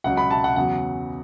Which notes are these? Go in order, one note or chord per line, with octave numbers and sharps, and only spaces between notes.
C#2 C#3 F#3 F#5
B5
A5
F#5
E2 C#3 F#3 F#5